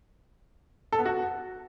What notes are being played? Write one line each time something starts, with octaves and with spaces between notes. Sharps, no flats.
A4
B3
F#4